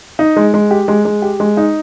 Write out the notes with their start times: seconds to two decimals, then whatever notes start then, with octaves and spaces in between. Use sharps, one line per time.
0.19 D#4
0.36 G#3
0.54 G#3
0.71 G4
0.88 G#3
1.05 G#3
1.22 G4
1.40 G#3
1.57 D#4